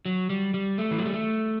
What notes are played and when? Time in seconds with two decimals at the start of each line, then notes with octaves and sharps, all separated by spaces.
0.05 F#3
0.30 G3
0.54 G3
0.78 A3
0.91 E3
0.98 F#3
1.06 G3
1.13 A3